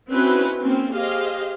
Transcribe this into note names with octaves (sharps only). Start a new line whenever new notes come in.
C4 C#4 D#4 E4 F#4 B4
A#3 C4 C#4
G4 G#4 C5 D#5 F5